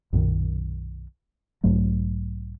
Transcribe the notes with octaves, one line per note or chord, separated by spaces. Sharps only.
B1 F#2 A#2 D#3
B1 G#2 F#3 A3